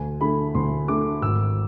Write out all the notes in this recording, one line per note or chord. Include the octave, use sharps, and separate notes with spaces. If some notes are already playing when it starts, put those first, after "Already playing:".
Already playing: D2 G#5
D3 A3 B5
D2 C6
D3 A3 D6
G#1 E6